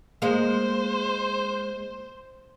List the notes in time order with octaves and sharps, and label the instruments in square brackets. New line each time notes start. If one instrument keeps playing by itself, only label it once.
[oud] G#3 A#3 [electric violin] C5